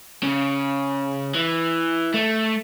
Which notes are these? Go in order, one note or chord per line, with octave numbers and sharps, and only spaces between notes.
C#3
E3
A3